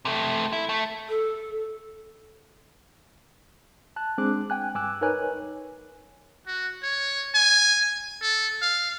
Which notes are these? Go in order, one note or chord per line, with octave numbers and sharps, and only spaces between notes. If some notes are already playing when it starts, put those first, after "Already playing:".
C3 A3
E4
A3
A4
A5 F#6
G#3 C4 D4 G#4 D6 F#6
G5 G#5 F#6
G2 G#5 D6 E6 F#6
D#4 A#4 B4 C#5 G#5 F#6
F#4
C#5
G#5
A4
F5